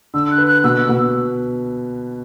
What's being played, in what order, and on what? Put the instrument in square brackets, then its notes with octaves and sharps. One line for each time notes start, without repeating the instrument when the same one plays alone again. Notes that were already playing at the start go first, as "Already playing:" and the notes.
[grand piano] D3 [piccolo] E6
[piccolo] F#6
[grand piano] B4
[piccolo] F#6
[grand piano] B2 [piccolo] E6
[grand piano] B2